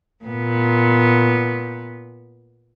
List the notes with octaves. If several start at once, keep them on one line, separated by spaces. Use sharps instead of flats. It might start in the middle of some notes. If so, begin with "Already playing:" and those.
A#2 B3